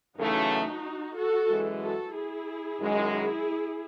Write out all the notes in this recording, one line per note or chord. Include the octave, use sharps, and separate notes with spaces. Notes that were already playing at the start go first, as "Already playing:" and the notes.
F#2 C#3 E3 A3 D#4 F#4
F#4 A4
F#2 E3 G#3
F#4 A4
E4 G#4
F#2 D#3 G#3
E4 G#4